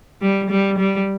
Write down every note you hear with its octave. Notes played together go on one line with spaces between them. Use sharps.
G3
G3
G3